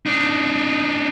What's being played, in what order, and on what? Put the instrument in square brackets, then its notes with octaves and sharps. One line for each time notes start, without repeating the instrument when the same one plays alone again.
[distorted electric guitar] D4 D#4